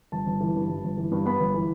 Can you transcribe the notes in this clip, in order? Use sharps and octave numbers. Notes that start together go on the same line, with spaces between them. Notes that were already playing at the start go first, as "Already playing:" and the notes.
G1 A5
G1
E3
G2
G1
G1
E3
G2
B3 B5
G1
E3